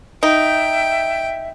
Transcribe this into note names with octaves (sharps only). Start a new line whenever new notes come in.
D#4 E5 G5